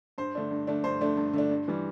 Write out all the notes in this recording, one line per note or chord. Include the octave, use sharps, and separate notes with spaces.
G2 C5
D3 A3 D4
G2
D3 A3 D4
G2 C5
D3 A3 D4
G2
D3 A3 D4
G2
E3 G3